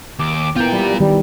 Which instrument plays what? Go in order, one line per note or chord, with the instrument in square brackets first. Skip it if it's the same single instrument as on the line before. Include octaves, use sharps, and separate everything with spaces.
[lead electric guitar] D#2 [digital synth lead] D6
[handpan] B3 E4 [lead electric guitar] F4 A#4 [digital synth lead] G5
[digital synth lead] G3
[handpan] D#3 [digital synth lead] G3